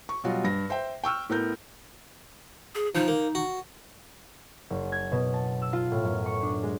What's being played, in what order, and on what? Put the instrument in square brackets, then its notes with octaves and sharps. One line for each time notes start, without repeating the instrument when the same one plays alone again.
[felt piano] C#6
B2 F#3 G3 F4 F#4
G2 A#6
C5 E5 G5
G5 C#6 E6 F6
A2 B3 A#4 G6
[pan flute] G#4
[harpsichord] F3 [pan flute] D#4
[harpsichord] A#3
F#4
[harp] F#1
G#6
B2
A5
E6
F4
A2
F#2
C#6
D4
G#3